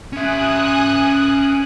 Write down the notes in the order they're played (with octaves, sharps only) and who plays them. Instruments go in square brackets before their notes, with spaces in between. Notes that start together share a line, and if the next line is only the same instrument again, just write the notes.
[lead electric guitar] C#4 E5 [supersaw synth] G#5 D#6 F#6